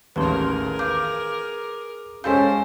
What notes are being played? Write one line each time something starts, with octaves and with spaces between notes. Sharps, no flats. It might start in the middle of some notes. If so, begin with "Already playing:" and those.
A1 D#2 G#4 A#4 B4 A5 C6
B4 F5 D6 G6
G#3 C#4 A4 C5 F5 G5 G6 B6